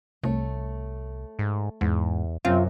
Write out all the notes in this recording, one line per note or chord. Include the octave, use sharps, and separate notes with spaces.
C2 A3 C#5
G#2
E2 G#2
F#2 C3 C4 F4 C#5